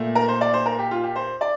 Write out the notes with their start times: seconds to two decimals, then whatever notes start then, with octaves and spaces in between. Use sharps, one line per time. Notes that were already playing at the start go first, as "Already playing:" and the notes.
Already playing: A#2 A3
0.15 A#4
0.28 C5
0.41 D5
0.54 C5
0.66 A#4
0.79 G4
0.91 F4
1.04 G4
1.16 C5
1.41 D5